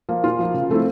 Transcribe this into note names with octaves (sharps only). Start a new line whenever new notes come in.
F3 A#3
A#2 F4
F3 A#3
C#3
F3 A3 C4 E4